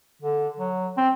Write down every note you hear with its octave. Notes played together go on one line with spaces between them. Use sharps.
D3
F#3
C4